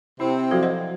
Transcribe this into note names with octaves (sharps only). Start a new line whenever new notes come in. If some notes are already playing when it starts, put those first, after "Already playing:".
C3 C4 E4
F3 F#3 F#4 A4 F5 G#6
C5 D#5 F#5